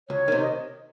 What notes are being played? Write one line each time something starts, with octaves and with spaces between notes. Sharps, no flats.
C#2 C#5
C3 D#3
D#5